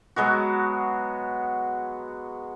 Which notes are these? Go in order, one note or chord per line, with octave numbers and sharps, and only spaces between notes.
F#3 G#3 B3 F#4